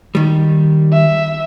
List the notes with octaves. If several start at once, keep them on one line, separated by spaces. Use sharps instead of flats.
D#3 G3
E5